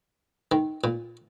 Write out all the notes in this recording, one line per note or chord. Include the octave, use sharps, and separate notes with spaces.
D#3
A#2